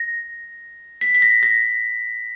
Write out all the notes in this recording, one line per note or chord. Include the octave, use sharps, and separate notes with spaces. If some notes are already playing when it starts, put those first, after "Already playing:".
Already playing: A#6
B6
B6
A#6
A#6